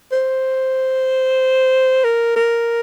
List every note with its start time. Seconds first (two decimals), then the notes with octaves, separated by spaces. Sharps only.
0.12 C5
2.04 A#4
2.36 A#4